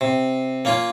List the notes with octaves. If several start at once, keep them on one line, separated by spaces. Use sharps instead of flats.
C3
A#3 C#4 F4